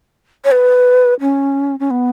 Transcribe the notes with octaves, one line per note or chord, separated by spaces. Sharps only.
C#5
B4
C#4
C#4
B3